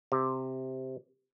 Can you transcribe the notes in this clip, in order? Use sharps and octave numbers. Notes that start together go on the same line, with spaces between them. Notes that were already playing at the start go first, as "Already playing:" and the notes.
C3